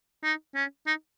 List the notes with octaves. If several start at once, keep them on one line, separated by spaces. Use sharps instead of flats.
D#4
C#4
D#4